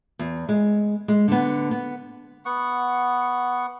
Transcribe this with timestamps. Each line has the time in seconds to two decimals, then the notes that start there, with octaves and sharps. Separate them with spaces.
0.19 E2
0.49 G#3
1.08 G#3
1.28 D3 B3
1.71 B3
2.46 B3 F#5 C#6